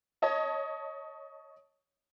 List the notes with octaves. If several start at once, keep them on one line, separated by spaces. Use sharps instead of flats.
C#5 D#5 A5